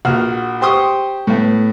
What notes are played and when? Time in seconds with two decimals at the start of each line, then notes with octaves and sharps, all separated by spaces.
0.05 A#1 F#4 F#5 F6
0.61 G4 C5 G5 C6 C#6 D#6
1.27 A2 B3